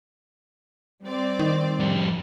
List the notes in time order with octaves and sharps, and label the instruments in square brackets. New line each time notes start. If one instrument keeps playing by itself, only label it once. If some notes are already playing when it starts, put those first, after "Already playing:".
[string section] G3 C4 D5
[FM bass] D#3
[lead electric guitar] F2 G3